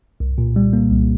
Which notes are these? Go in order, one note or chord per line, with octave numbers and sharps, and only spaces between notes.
C2
A#2
G3
A#3
C2